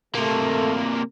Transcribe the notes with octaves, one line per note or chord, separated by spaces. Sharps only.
C3 A3 A#3